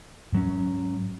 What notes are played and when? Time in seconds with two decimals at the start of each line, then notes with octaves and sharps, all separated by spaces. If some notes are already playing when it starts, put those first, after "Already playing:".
0.33 G#2 F#3 C#4